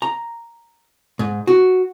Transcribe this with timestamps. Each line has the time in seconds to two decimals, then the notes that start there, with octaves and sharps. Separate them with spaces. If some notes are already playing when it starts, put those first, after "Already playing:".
0.02 A#5
1.19 G#2
1.47 F#4